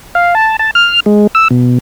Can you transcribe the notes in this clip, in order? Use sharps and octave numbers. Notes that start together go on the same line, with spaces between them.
F5
A5
A5
F6
G#3
E6
B2